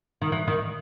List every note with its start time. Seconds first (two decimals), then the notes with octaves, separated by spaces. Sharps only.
0.22 D#3
0.32 E3
0.48 D#3